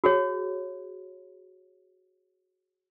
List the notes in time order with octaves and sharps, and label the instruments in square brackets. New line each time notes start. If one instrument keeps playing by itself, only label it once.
[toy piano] F#4 G#4 C#5